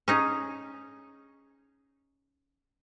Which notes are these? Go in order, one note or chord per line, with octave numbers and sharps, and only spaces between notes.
C#4 D#4 G#4